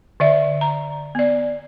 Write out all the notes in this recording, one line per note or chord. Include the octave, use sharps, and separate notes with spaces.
D3 D5 E5
A#5
B3 D5